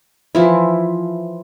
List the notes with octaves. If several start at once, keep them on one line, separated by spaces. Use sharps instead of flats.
E3 F3 E4